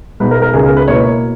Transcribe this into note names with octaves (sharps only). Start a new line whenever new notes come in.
B2 G#3 B3 D#4 B4
A#4
A#4
C#2 C#3 G#3 D#4 G#4
A#4
B4
B2 A#3 E4 C#5